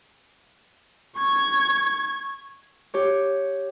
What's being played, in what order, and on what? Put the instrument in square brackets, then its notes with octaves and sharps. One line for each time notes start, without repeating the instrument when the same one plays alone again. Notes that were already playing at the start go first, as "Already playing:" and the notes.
[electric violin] C#6 G#6
[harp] G4 C#5